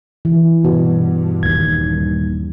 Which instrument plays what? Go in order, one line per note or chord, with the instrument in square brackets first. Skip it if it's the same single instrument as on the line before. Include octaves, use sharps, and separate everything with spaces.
[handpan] E3
[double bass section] G2 [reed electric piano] B2 [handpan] F#4
[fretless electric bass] D#1 D#2 [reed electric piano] G#6